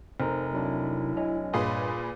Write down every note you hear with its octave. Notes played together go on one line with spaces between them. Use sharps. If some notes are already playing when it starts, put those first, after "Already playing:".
F1 C3 D#4 A#4 C5 A#5
F#3 C4 D4 E4
C#5 D#5 G#5
G2 A#2 G#4 B4 F5 C6 D#6